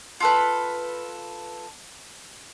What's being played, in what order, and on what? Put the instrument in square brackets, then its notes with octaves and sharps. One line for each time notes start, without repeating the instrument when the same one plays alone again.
[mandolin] F4 A4 B4